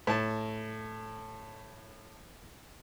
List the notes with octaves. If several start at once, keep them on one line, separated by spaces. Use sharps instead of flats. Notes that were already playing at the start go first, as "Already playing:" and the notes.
A2 A5